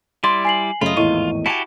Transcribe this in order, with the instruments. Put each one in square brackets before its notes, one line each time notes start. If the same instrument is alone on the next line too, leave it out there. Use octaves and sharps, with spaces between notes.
[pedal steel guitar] G3 E4 D5 [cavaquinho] C6
[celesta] G#5 C7 F#7
[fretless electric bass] F#2 C#3 A3 [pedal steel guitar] F4 [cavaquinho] D#5 B5
[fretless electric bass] G#1 E2 A2 [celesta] E4 D#5 D#7 [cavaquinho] C#6
[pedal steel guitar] E4 F#4 G4 [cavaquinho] G#5 A5